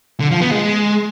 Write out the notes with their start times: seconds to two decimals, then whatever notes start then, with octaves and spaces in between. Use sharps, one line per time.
0.20 D3
0.31 F3
0.41 B3
0.52 G#3